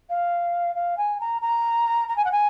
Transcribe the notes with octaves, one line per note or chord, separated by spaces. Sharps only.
F5
F5
G#5
A#5
A#5
A#5
G#5
F#5
G#5